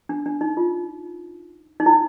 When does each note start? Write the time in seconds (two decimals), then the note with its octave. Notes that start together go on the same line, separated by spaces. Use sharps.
0.09 D4
0.26 D4
0.41 D#4
0.57 F4
1.80 D#4
1.86 E4